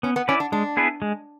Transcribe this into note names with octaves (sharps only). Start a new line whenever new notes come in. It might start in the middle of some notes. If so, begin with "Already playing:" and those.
B3 C#4
B3
C#4 E4 B4 D5
D4
G#3 D4
B3 E4 G#4 B4
G#3